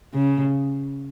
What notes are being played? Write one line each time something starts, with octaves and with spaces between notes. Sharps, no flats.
C#3